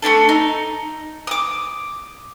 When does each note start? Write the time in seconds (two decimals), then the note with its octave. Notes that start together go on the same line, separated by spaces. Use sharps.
0.02 A3 B3 D4 A4
0.29 D#4
1.27 D6 D#6